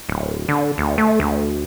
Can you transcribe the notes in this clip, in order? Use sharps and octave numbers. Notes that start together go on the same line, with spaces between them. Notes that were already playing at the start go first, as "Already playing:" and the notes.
D1
D3
D2
A3
D2